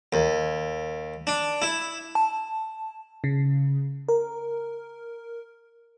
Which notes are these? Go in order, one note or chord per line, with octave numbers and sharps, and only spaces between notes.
D#2
D4
E4
A5
C#3
A#4